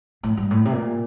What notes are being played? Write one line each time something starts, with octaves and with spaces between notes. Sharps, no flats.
A2
G2
A2
C3
A#2